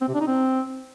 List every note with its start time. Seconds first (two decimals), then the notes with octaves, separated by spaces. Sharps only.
0.02 C4
0.08 C3
0.14 D4
0.21 D#4
0.27 C4